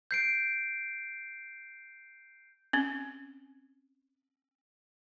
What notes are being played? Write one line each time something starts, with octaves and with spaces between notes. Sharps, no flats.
G6 C7 D7
C4 C#4